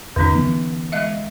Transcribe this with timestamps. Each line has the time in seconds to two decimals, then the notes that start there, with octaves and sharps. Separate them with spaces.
0.16 E2 D3 C#4 D#4
0.35 E3 B3
0.92 G#3 D#5 E5